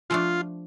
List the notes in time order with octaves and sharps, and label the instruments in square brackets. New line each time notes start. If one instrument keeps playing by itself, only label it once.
[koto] F3 A3 D4 [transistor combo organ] F4